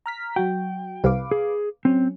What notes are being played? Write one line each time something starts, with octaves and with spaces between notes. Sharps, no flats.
A#5 F6 B6
F#3 F#4 G5
C2 B4 F5 D6
G#4
F#3 C4 C#4